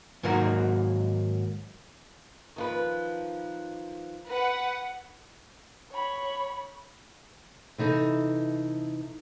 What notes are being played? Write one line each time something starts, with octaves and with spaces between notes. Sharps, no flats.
G#2 D#3 F#3 A#3 F#4
D#3 F3 B4
B4 F#5
C#5 B5
C3 E3 D#4 A4